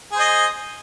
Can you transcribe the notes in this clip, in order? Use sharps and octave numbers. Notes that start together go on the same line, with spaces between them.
G#4 C5 D#5